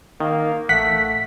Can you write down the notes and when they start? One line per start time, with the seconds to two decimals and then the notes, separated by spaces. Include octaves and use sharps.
0.20 D#3 A#3
0.69 A1 A3 F#5 B6